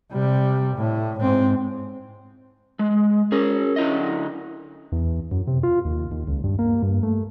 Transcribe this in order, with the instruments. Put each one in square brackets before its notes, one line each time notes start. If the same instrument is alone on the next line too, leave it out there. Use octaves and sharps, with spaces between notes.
[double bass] C3 G3
A2
G#2 C4
[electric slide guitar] G#3
[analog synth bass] C#4 [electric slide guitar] G#4 A#4
[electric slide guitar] D3 E4 D#5
[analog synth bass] E2
F#2
C3
F4
D#2
D#2
C#2
G2
A#3
G2
A3